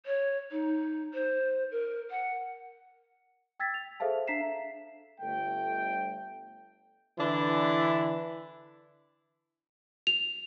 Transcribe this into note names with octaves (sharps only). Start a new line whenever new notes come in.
C#5
D#4
C5
A#4
F#5
G5 E6 G#6 A6 B6
F7
G#4 A4 C5 E5 F5 A5
D4 E5 A#5 B6 C7 E7
G1 A3 G5
D3 E3 D4 E4
F7